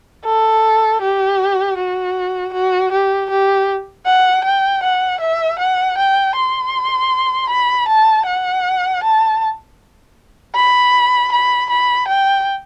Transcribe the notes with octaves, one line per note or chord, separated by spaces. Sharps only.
A4
G4
F#4
F#4
G4
G4
F#5
G5
F#5
E5
F#5
G5
C6
B5
A5
F#5
A5
B5
B5
B5
G5